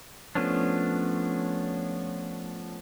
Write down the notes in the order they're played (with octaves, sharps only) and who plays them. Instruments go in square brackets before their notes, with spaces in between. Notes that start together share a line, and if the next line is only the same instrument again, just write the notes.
[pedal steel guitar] F3 A3 B3 C#4 D4